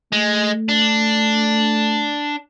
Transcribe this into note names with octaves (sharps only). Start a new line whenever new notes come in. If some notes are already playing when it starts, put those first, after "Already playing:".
G#3 A3
D4